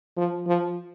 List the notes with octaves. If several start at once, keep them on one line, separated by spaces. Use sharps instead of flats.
F3
F3